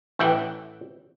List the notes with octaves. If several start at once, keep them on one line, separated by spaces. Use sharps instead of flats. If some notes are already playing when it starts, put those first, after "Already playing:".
A1 E3 E5 F#5 G5